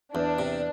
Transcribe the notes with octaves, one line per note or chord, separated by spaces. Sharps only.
E2 D4
C3